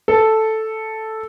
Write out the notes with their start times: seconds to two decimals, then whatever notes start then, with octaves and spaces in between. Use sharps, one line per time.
0.08 A4